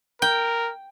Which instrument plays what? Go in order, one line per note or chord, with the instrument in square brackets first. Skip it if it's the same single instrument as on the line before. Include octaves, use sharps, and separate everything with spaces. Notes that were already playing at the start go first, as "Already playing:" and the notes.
[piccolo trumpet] A#4 [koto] G5